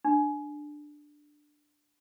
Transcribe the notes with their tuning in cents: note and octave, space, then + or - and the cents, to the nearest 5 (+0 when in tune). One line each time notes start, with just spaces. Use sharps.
D4 +10